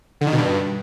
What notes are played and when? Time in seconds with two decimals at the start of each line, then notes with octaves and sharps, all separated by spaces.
0.21 D3
0.27 D#3
0.32 B2
0.38 G2